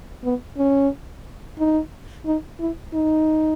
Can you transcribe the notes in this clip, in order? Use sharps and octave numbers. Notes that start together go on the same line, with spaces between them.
B3
C#4
D#4
D#4
E4
D#4